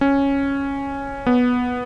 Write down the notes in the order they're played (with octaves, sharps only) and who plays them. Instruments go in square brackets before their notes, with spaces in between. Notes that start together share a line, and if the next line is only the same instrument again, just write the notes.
[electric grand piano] C#4
B3